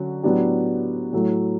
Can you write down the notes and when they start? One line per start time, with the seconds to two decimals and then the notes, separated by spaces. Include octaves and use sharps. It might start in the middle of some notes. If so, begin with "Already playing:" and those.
Already playing: D3 F#3 C#4 F#4
0.23 A2 F#3 B3 D4 G4
1.13 A2 F#3 A3